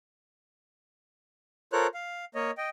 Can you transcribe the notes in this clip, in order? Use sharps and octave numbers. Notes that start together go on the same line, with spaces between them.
F4 A4 A#4 C5 C#5 F#6
F5
A#3 C#5 D#5
D#5 G5